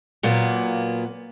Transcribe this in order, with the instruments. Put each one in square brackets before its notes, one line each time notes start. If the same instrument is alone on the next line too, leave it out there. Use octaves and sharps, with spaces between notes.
[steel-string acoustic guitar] A#2 F#3 A#3 B3